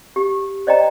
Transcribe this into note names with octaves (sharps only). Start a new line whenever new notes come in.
G4
C5 D5 D#5 G5 A#5